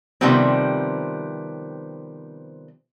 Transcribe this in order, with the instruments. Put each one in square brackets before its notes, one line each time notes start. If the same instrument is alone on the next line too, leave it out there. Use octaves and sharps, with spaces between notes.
[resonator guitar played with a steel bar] C3 D#3 F3 G3 B3 C4